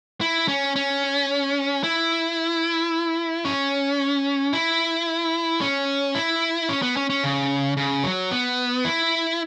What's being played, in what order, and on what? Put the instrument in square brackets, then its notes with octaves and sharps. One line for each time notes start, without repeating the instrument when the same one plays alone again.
[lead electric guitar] E4
C#4
C#4
E4
C#4
E4
C#4
E4
C#4
B3
C#4
C#4
C#3
C#3
F#3
B3
E4